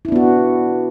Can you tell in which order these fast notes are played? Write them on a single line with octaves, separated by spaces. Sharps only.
E4 D4 B3 F#4